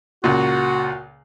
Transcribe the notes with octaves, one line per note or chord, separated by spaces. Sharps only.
C#2 A#2 F#4